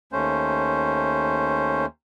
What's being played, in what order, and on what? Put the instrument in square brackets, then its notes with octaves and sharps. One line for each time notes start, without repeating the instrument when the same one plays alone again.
[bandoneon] D#2 A3 C#4 C5